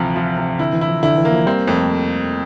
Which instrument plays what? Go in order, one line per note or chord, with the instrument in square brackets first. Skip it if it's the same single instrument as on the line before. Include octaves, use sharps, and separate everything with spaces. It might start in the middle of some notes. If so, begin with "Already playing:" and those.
Already playing: [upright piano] D2 C3 F3 [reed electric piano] E3
[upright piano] F3
C3
[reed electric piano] D3 [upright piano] E4
[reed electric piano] E3
[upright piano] E4
[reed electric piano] F3
[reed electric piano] D3 [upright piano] E4
[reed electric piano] E3
[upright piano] A#3
[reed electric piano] F3
[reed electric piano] G3 [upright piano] C4
[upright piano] F2 [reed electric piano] A3